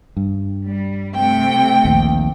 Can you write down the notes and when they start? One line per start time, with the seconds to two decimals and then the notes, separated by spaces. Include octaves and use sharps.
0.17 G2
0.67 G3
1.16 C3 A3 G5
1.85 A#1 D#2